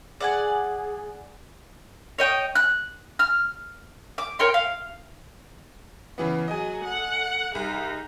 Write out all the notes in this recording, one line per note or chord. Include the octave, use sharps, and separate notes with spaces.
G#4 D5 F#5 G#5
C#5 D#5 G5
F#6
F6
D6
A#4 C#5 G5 C6
F5
C#3 E3 B3
F#3 G#4 D#5 G#5
A4 F#5
C2 D#4 G#4